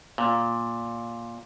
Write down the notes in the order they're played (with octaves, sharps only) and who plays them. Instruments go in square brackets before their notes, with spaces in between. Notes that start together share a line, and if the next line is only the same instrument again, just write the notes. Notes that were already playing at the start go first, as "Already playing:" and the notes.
[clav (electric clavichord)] A#2